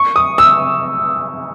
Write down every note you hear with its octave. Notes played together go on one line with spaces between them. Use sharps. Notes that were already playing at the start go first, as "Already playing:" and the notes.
Already playing: C#6
D#6
E6